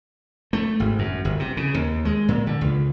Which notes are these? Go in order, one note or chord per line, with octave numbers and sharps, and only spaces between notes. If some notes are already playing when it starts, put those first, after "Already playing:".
A3
G#1
F#2
G1
C3
C#3
D#2
G#3
A#2
D3
C#2